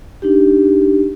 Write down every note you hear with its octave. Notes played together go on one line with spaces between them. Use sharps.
D4 D#4 G4